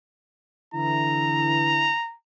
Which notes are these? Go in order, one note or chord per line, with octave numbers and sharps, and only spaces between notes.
D3 E3 E4 A#5